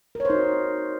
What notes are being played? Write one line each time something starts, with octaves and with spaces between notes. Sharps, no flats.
D#4 F#4 A#4 C5 C#5